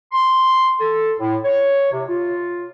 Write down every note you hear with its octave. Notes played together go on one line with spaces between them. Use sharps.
C6
A4
A2
C#5
C3
F4